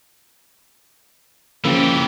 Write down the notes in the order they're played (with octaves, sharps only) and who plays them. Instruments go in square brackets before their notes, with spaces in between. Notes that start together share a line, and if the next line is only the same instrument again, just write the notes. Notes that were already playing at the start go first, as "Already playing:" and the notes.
[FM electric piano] C#3 F3 A#3 [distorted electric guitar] E3 G4